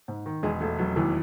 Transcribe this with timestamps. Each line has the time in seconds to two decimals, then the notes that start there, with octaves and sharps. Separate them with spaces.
0.08 G#2
0.26 D#3
0.43 E1 G#3
0.60 E1 A3
0.79 E1 F#3
0.96 D#2 E3